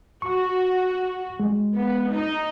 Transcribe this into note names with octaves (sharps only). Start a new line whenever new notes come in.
F#4 C#6
G#3
B3
D#4